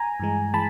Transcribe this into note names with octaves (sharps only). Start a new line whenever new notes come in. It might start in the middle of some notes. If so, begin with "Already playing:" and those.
Already playing: G#5 A#5
G2 E3 G#3
E3 G#3 A5 B5